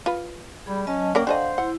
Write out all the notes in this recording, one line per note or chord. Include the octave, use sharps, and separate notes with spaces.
F4 B4
G3 G#4 B5
F#3 C#4 D#5 A5
A#3 C#4 A#4 D5 F#5 G5 C#6
D4 A4 C5 D#5 F5 F#5
E4 F#5